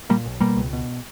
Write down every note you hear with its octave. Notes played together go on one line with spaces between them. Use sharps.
A#2 G3 A#3
B1
B2 G3 A#3
C#2
B2